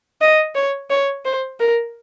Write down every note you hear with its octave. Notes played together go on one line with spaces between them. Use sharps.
D#5
C#5
C#5
C5
A#4